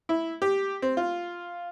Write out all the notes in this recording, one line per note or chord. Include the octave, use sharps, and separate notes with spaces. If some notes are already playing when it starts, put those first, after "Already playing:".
E4
G4
C4
F4